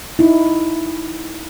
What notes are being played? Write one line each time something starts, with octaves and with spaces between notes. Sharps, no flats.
D#4 E4